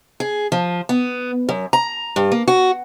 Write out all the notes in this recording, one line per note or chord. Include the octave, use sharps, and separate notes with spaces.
G#4
F3
B3
F#2
A#5
G2
A#3
F#4